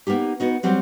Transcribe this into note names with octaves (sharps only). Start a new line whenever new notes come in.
A#3 B3 D#4 G4
B3 D#4 F#4
F#3 G3 C4 F#4